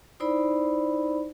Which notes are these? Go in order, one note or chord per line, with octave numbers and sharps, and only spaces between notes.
D#4 E4 C5 D5 B5